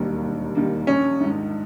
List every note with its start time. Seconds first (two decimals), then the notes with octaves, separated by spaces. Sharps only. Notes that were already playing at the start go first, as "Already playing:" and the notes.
Already playing: E1 D#2 D#3 G3 A#3
0.23 E1
0.55 D#2 D#3 G3 A#3
0.87 A#1 C#4
1.21 G#2 D#3